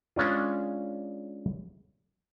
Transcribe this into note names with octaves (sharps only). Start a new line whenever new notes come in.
G#3 C#4 D4 F4